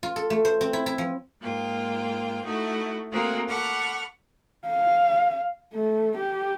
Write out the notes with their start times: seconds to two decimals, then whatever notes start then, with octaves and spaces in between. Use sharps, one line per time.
0.03 F4
0.16 A4
0.30 A3
0.45 C5
0.61 C4
0.73 E4
0.86 E4
0.98 F3
1.40 G#2 A#3 F4 G5
2.44 A3 D#4 E4 F#4
3.11 A3 A#3 C4 F#4 G#4 A#4
3.49 A4 F#5 B5 C#6 D6 F6
4.68 F5
5.74 A3
6.17 G4